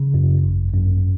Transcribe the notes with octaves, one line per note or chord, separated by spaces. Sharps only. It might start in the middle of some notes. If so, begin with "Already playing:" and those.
Already playing: C#3
F#2
G#1
F#2